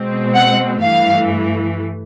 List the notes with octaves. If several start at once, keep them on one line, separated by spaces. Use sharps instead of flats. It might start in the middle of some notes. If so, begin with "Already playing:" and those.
Already playing: B2 G#3 C4
F#5
G2 E3 A3 F5